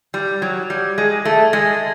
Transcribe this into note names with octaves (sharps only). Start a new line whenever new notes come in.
G3
F#3
G3
G#3
A3
G#3